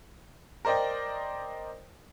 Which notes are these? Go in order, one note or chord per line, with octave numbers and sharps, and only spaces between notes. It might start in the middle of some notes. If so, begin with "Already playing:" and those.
A#4 C5 D5 D#5 G5